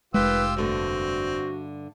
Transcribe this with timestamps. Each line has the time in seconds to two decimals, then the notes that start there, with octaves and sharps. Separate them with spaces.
0.14 F1 D#3 G#3 F4 G4 B4 E6
0.57 G2 D3 A3 C4 F#4